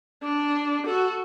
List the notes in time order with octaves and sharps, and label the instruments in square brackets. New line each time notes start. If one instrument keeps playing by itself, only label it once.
[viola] D4
F#4 A4